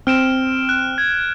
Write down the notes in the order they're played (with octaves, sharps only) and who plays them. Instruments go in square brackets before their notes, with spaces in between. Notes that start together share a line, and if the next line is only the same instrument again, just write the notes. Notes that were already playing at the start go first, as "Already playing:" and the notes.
[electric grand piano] C4 [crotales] F6 D7 E7
[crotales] F#6
G#6